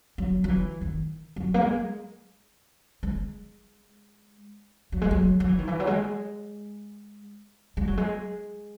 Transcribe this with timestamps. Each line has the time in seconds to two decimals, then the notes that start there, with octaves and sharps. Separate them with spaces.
0.18 F#3
0.44 F#3
0.49 E3
0.81 D#3
1.36 F#3
1.54 A#3
1.61 G#3
3.03 G#3
4.92 F#3
5.01 G#3
5.11 F#3
5.40 F#3
5.49 E3
5.59 D#3
5.67 E3
5.80 F#3
5.87 G#3
7.77 G#3
7.87 F#3
7.97 G#3